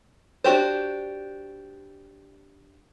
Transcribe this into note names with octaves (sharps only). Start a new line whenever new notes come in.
D4 F#4 G4 C5